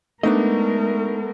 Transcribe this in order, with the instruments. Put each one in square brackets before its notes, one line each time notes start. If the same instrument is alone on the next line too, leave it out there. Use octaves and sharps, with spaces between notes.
[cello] G#3 A#4 [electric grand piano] A3 B3 [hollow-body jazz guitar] D4 D#4 D#5